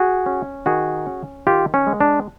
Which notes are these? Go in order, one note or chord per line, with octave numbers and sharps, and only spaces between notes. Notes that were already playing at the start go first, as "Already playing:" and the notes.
Already playing: F#4 G#4
C#4
D#3 F#4 G#4
C#4
D#3 F4 G4
C#4
G#3
D4